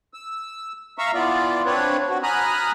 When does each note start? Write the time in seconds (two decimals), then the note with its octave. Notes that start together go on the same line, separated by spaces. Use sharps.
0.14 E6
0.98 E5 F5 A#5 C#6 E6
1.14 E3 B3 F4 D5
1.66 C4 D4 B4 C#5
2.10 F#4
2.23 G#5 A#5 B5 D#6 F6 F#6